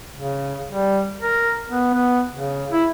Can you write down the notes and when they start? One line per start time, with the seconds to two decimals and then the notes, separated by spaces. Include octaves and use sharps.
0.16 C#3
0.68 G3
1.19 A#4
1.69 B3
1.94 B3
2.34 C#3
2.72 E4